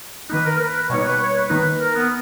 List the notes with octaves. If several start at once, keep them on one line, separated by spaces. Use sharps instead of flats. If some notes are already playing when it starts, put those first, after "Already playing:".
D#3 A#3 D#4 B4
A#4
A#4
B4
B2 G3 A#3 D#4 C#5
B4
C#5
B4
D#3 A#3 D#4
A#4
B3